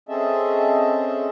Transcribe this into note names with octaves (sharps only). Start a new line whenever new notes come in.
C4 C#4 G#4 A4 D#5 E5